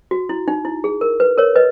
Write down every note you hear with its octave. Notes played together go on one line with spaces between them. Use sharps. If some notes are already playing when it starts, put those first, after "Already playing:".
F#4
E4
D#4
E4
G#4
A#4
B4
A#4 C#5
B4 D#5